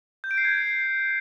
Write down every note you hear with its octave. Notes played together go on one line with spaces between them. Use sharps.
G6
D7
C7
G#6